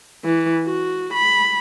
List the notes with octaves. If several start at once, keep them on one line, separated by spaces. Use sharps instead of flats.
E3
F#4
B5